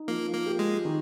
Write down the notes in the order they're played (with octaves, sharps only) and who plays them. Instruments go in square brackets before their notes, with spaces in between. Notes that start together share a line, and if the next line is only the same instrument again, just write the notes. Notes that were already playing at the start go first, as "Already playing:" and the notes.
Already playing: [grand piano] D#4
[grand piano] F3 [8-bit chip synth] A#3
[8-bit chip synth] A#3
[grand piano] G4
[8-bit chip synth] G#3
[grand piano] D#3